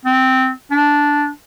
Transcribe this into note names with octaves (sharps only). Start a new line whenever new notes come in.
C4
D4